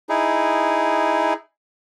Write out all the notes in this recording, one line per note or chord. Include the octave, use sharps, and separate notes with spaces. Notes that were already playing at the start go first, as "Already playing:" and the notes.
D#4 E4 G#4